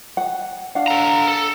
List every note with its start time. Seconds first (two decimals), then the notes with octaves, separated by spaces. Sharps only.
0.17 F#5
0.75 D4 F5 F#5
0.88 A4 A#5
1.28 A4